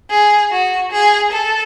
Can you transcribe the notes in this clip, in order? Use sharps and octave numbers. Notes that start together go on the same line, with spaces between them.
G#4
F#4
G#4
A4